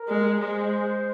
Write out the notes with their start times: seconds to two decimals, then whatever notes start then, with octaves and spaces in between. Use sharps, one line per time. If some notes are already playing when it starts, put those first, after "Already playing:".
Already playing: A#4
0.09 G#3
0.40 G#3 C5